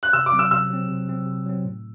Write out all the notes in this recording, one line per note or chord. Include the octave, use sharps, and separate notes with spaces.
F#6
C3 E6
D6
F#3 C4
E6
C3 E6
F#3 C4
C3
F#3 C4
C3
F#3 C4
A2